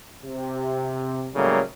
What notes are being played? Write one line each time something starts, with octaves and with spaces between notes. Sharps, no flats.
C3
A2 C#3 F#3 G3 A3 A#3